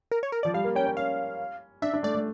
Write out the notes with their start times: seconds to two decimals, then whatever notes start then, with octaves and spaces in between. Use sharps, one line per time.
0.11 A#4
0.23 C#5
0.32 A#4
0.43 F3 D5
0.54 G3 F5
0.64 A#3
0.75 C#4 G5
0.87 C#4
0.97 C#4 F5
1.82 D4 E5
1.94 D4
2.03 A3 D5
2.15 A3